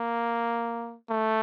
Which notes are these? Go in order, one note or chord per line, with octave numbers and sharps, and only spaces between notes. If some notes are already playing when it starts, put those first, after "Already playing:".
Already playing: A#3
A3